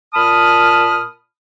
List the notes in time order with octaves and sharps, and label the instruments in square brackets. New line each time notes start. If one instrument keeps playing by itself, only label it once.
[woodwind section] A#2 A5 B5 D#6 F6